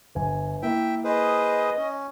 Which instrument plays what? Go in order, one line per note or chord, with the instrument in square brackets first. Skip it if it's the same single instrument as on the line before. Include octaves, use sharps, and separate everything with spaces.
[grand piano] G1 G#5
[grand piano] A#3 E4 [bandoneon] E5 G5
[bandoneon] G#4 B4 C5 [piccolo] D#5
[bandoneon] C#4